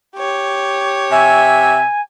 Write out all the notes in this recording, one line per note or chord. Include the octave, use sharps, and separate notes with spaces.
G4 C#5
C3 E5 G#5